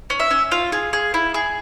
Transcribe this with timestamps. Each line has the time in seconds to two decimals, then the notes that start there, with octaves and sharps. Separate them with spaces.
0.10 C#4
0.20 E5
0.31 C#4
0.52 F4 F5
0.72 G#4
0.93 G#4
1.14 E4
1.34 G#4